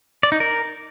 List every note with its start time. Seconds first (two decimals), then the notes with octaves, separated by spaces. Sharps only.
0.23 D5
0.32 D#4
0.40 A#4